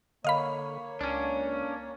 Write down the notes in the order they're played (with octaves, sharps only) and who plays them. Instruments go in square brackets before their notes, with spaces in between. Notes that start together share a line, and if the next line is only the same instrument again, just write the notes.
[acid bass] D3 [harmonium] A#3 C#5 [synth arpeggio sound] D#5 F5 B5
[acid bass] C#2 [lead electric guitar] C#4 D4